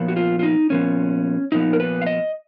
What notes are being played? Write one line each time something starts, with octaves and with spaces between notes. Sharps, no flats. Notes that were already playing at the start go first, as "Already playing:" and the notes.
Already playing: A#2 F3 B3
F#4
F4
F4
D#4
A#2 F3 B3 C#4
A#2 F3 B3 D#4
A#4
B4
F5
D#5